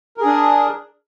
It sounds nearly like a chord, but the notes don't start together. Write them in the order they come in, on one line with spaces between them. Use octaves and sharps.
A#4 G#4 D4